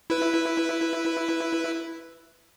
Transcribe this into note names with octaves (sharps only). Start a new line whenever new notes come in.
E4 B4